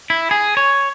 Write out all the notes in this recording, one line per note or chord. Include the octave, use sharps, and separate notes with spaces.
E4
G#4
C#5